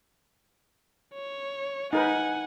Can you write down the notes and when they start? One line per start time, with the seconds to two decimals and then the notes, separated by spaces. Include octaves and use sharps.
1.14 C#5
1.93 D#4 A#4 B4 F#5 G#5